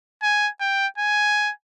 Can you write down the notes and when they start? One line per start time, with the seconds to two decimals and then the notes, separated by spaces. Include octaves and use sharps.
0.22 G#5
0.60 G5
0.98 G#5